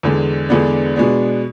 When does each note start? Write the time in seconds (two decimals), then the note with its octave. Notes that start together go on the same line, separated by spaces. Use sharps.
0.03 E2 D3 G#3
0.49 E2 D3 G#3 B3 D4
0.96 B2 G#3 B3 D4